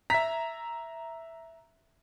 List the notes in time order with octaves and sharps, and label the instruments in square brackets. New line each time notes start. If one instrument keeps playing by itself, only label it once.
[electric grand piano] E5 A#5 [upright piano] B6